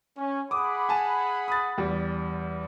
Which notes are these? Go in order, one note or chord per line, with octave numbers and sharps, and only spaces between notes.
C#4
G#4 F#5 B5 D6 D#6
G#5 A5
D#6 A6
E2 G3